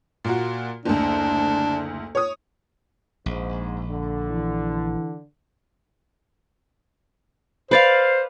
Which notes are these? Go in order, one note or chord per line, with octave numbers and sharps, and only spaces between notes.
A#2 A#3 F#4
F#1 D2 D4
C#5 D#6
A#1 G#2
D3
E3
B4 C5 D5 F5